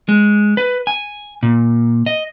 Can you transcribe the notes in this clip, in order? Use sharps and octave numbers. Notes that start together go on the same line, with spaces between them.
G#3
B4
G#5
A#2
D#5